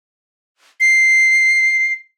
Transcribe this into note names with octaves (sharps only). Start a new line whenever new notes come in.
C7